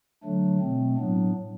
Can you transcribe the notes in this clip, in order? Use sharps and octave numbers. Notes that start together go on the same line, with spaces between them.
D3 F#3 A3 D4
B2 A3 C4
A2 F#3 B3 D4